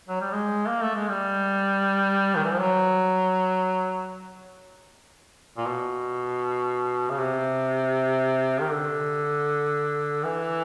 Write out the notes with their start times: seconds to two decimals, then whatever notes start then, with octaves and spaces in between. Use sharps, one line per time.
0.08 F#3
0.21 G3
0.32 G#3
0.68 A#3
0.82 A3
0.95 G#3
1.08 G3
2.36 D#3
2.44 E3
2.53 F3
2.61 F#3
5.57 A#2
5.66 B2
7.09 C#3
7.19 C3
8.61 D#3
8.71 D3
10.24 E3